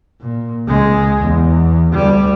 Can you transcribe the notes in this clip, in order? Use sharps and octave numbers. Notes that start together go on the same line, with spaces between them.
A#2
C#2 G#3
E2
D2 G3